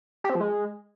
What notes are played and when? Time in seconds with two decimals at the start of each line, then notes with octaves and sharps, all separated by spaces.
0.24 G4
0.30 C4
0.35 F3
0.40 G#3